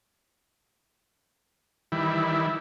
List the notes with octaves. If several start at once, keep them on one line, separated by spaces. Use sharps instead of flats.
D#3 E3 G3 E4